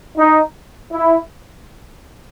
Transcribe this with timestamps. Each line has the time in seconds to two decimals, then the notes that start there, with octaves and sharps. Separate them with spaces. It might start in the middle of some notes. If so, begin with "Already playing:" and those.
0.17 D#4
0.92 E4